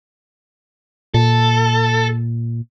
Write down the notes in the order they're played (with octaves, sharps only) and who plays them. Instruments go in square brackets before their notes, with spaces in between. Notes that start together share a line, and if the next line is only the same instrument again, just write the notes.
[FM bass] A#2 [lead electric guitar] A4